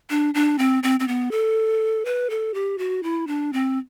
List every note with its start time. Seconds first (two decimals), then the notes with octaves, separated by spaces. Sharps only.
0.10 D4
0.34 D4
0.58 C4
0.83 C4
1.00 C4
1.08 B3
1.31 A4
2.05 B4
2.30 A4
2.54 G4
2.78 F#4
3.03 E4
3.27 D4
3.53 C4